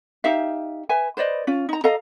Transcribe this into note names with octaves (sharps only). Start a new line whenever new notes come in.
D#4 G4 E5 F5
B4 E5 G#5
B4 C5 D5 D#5
C#4 F4
D#4 A#5
A4 D#5 F5 A#5